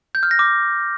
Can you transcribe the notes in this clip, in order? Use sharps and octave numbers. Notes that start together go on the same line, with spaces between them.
G6
F6
A#6
D6